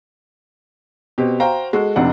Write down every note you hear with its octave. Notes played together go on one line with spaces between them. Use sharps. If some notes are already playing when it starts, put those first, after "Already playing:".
B2 C4 G4
F#4 C5 F5 G5 A#5
G#3 F#4 A4
F1 F2 C3 D4 F#5